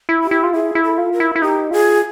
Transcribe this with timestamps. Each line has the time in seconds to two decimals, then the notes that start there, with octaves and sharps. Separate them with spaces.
0.09 E4
0.24 G4
0.31 E4
0.43 F4
0.53 E4 G#4
0.75 E4
0.83 A4
0.98 F4
1.12 A#4
1.20 E4
1.36 E4
1.41 D#4 G4
1.71 F4 G#4